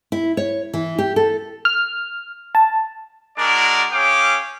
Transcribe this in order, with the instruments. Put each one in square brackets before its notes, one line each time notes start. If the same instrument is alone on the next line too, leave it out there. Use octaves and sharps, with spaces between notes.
[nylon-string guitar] E4
C#5
E3
G4
A4
[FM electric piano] F6
A5
[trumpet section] G#3 D4 F#4 A#4 D5
C#4 G#4 F5 G5 D6